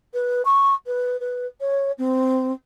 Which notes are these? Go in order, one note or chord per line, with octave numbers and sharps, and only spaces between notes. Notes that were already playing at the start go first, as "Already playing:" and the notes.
B4
C#6
B4
B4
C#5
C4